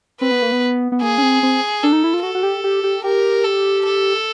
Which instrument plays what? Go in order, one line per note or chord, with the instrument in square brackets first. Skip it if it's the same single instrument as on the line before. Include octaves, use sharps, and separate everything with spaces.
[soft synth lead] C4 [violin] B4
[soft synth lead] B3
A#3
B3
B3
[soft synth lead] A#3 [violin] G#4
[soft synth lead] C#4
C4
C4
[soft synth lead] D4 [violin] A4
[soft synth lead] D#4
E4
F4
[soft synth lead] F#4 [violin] A4
[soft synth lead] F#4
G4
G4
G4
[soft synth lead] G4 [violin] A#4
[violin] A4
A4